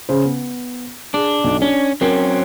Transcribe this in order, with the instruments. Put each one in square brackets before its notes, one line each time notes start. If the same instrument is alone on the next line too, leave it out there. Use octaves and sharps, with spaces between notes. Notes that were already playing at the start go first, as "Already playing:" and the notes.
[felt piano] C#3 C5
B3
[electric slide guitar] D4 [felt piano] G#4
[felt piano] B1
[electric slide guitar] C#4 [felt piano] D4
[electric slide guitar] F#3 C4 C#4 [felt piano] A#4 C5